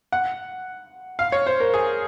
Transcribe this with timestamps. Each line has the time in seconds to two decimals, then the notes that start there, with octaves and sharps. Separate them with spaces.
0.12 F#5
1.19 F5
1.32 C#5
1.47 C5
1.60 A#4
1.74 G#4